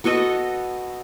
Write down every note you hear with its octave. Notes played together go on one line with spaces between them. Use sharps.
B3 F#4 A4 D#5